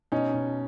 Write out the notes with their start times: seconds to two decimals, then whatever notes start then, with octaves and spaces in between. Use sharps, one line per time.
0.12 B2 C#4 D#4
0.34 B2